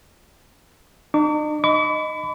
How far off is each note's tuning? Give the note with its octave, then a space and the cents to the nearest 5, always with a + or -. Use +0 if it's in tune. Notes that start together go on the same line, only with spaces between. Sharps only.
D#4 -45 D6 -45
D#5 +0 B5 +30 D6 -45